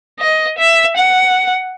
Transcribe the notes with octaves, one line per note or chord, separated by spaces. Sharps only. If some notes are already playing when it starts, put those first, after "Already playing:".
D#5
E5
F#5